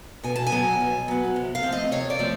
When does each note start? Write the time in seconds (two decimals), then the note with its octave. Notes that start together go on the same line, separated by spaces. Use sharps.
0.23 B2 G#5
0.36 A5
0.47 G#5
0.52 F#3 B3
0.80 B2
1.08 F#3 B3
1.36 C3
1.55 F5
1.63 F3 A3 C4
1.72 D#5
1.92 C3 C#5
2.10 D5
2.19 F3 A3 C4